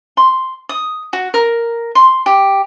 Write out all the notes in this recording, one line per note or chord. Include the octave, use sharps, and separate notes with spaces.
C6
D#6
F#4
A#4
C6
G4